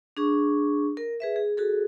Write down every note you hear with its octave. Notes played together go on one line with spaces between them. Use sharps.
D4 G#4 C#6
A#4
G#4 B4 E5
G#4
F#4 G#4 A4